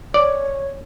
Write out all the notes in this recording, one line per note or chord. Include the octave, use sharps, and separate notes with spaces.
C#5 D5